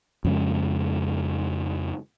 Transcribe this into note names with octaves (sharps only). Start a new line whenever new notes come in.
F2 C#3 G#3